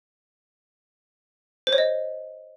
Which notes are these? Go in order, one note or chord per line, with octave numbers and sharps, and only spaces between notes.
C5
C#5
D#5